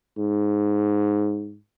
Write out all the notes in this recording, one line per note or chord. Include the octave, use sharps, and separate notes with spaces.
G#2